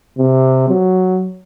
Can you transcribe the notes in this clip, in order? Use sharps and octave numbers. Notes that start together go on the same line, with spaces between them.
C3
F#3